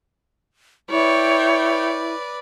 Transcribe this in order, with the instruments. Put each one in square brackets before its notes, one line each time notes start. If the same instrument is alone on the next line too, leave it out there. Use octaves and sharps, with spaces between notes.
[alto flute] E4 [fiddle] B4 D5 [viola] C#5 G5